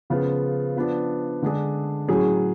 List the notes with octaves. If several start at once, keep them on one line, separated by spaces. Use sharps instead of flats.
C#3 F3 B3 F4
F3 B3 D4
D3 G#3 D4 G#4
A2 F#3 C#4 G#4